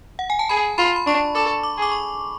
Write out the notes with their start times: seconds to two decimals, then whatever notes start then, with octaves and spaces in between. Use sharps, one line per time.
0.19 F#5
0.30 G#5
0.39 A5
0.49 G#4 B5
0.78 F4 B5
0.96 B5
1.07 D4 C#6
1.35 A4 D6
1.63 D6
1.78 G#4 D6
1.92 C#6